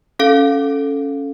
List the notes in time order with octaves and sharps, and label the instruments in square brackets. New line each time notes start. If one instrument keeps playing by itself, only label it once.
[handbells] C#4 A4 F5